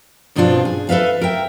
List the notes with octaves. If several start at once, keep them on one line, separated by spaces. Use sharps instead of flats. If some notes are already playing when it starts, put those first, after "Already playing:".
G2 B2 F3 C4 D4 F4
G#4
A4 B4 E5 F5
A#4 E5 G5